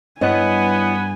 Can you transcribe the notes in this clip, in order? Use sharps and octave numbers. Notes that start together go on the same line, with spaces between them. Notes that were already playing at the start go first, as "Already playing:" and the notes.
G2 B3 E4 C#5 D#5 G#5